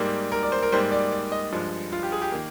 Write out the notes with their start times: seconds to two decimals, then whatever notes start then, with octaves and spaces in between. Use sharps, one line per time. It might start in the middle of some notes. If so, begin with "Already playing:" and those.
Already playing: G#2 G3 A#3
0.32 A#4
0.43 D5
0.52 C5
0.63 A#4
0.72 G#2 G3 A#3 C5
0.92 D5
1.12 D5
1.32 D#5
1.52 G2 F3 G#3
1.92 F4
2.03 G4
2.12 G#4
2.22 G4
2.32 D#3 A#3